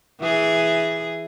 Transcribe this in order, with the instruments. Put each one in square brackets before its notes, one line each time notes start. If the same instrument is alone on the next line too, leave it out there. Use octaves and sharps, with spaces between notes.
[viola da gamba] E3 G#4